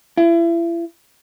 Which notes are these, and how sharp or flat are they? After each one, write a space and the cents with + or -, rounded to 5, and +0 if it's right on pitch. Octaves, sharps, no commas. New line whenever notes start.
E4 +35